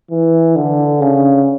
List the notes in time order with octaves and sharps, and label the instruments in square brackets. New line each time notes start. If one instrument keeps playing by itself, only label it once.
[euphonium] E3
D3
C#3